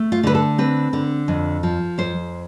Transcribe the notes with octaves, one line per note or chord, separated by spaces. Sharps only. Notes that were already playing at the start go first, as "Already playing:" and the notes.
Already playing: A3
F4
D3 B4
A4
C4 B4
D3
F2
F3
F2 C5